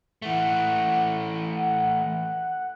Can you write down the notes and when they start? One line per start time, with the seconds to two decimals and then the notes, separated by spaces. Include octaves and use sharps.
0.22 E3 A3 F#5
1.53 F#5